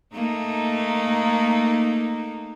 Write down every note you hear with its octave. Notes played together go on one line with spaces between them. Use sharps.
A3 A#3 D#4